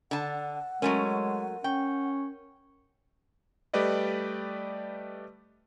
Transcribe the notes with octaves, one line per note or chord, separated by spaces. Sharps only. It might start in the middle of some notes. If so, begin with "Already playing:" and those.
D3 F#5 A5
F#3 G#3 A3 C#4 A#4 D#7
C#4 G5
G3 A3 G4 B4 D5 D#5